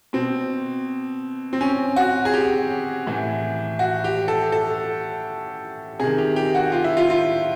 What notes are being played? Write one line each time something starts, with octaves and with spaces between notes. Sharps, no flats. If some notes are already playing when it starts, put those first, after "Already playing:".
B2 C4
C4
C#4
F#4
G#4
G4
A2 E3
F#4
G4
A4
A4
C3 D#3 G#4
G4
G4
F#4
F4
E4
F4
F4